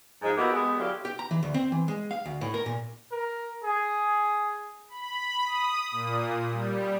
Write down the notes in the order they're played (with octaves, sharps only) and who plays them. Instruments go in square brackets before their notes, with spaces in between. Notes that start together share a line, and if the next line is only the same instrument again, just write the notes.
[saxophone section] G#2 F3 G#3
A#3 B3 D#4 E4 F#4 G4
G#3 B3 G4
D3 F#3 E4 F4 G4 G#4
[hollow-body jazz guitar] G4
A#5
E3
D2
C4
E3
G#3
F5
D2
A2
A#4
A#2
[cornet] A#4
G#4
[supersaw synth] B5
D#6
A#2
G3